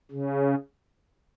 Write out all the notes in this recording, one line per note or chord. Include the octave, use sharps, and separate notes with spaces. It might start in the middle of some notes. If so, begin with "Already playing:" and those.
C#3